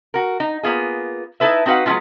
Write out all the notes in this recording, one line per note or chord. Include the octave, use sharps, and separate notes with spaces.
F#4 A#4
D#4
A#3 B3 F4 G#4
D#4 E4 A4 B4 E5
C4 D#4 F#4 B4 F5 F#5
F#3 G#3 B3 C#4 E4 F4